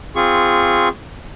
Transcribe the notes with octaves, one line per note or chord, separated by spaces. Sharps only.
C4 F4 G#4 C#6